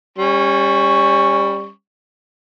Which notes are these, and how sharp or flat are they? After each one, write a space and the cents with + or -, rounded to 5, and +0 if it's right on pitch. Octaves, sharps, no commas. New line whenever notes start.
G3 +15 C#4 -20 C#6 +0